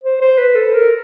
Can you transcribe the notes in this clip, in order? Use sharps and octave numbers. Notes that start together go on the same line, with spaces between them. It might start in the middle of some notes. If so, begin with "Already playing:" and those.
C5
C5
B4
A4
A#4